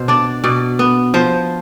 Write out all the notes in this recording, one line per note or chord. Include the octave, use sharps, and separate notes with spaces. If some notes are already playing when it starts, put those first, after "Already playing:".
Already playing: B2 C5
D4 D5
B2 D5
B3
F3 C5